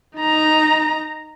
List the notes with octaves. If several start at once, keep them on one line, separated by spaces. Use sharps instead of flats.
D#4 A#5